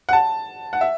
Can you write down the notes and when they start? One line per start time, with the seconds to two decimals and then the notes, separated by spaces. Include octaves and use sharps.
0.09 F#5
0.13 A5
0.73 F#5
0.81 E5